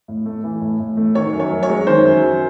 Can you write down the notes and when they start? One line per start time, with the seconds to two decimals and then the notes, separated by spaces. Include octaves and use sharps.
0.08 A2
0.26 A3
0.44 E3
0.61 A2
0.80 A2
0.97 A3
1.15 D#3 C#5
1.33 F#2
1.40 C#5
1.51 F#2
1.63 C#5
1.69 G#3
1.87 D#3 C5
2.05 F#2
2.23 F#2